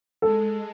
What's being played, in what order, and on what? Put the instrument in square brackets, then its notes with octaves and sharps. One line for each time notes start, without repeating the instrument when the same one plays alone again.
[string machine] G#3 [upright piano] A4